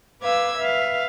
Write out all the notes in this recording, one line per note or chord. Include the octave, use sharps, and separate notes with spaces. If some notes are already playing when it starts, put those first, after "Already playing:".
B4 F5 D6 E6 G#6
B4 E5 F5